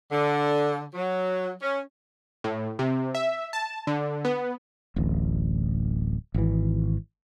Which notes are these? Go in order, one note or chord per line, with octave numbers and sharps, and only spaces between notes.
D3
F#3
C#4
A2
C3
E5
A5
D3
B3
D1 A1
G#1 E3